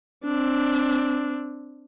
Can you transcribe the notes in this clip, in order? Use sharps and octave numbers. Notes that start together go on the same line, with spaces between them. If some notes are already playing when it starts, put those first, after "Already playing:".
C4 D4